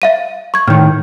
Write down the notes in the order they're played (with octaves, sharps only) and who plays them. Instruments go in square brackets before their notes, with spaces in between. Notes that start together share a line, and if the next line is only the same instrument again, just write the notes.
[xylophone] E5 F5 D#7
C#6 G#6
[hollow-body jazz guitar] A2 D#3 [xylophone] F6